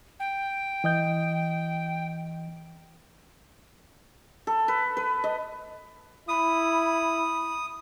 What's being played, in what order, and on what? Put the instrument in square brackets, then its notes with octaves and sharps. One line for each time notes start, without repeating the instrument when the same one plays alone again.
[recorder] G5
[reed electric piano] E3 D#5 G6
[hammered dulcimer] A4
B4
B4
D#5
[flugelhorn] E4 [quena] B5 [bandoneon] D#6